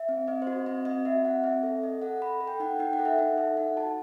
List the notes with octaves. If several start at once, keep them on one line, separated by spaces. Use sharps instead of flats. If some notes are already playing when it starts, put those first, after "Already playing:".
Already playing: E5
C4
C4 D#5
C5
F#4 D#5
C4 D#5
C4 D#5
F#4 E5
C4 F#5
C4 E5
A4
A4 D#5
A4 F#5
A4 B5
A4
G5
D#4 F#5
D#4 G5
F#5
A4
E5
D#4 F#5
A4 E5
D#4 F#5
F#4 A5